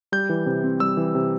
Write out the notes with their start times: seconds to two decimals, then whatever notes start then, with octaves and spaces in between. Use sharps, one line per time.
0.12 G3 G6
0.29 E3
0.46 C3
0.64 C4
0.80 G3 E6
0.97 E3
1.15 C3